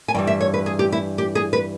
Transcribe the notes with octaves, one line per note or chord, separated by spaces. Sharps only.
G#5
G2 E3 G3 G5
E5
C#5
B4
G#4
G4
E4
G4
G#4
B4